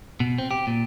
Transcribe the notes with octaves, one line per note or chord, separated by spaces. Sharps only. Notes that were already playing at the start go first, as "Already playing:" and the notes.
B2
C4
G4
A#2